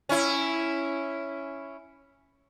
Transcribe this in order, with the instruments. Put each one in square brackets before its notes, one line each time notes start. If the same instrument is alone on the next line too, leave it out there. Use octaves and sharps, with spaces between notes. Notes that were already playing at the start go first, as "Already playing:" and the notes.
[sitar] C#4 E4